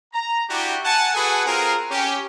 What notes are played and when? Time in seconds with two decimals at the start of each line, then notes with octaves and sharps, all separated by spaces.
0.13 A#5
0.50 D4 E4 F#4 G4
0.84 F#5 G#5 A5
1.14 F#4 G#4 A4 B4 F#5 G#5
1.46 C4 F4 G#4 A#4
1.91 C#4 G4